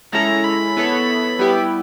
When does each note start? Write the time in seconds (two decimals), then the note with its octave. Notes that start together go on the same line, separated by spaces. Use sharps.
0.13 G#3 C#4 E4 A4 A#5
0.44 B5
0.77 B3 E4 A4 C#5
1.39 G3 B3 E4 G4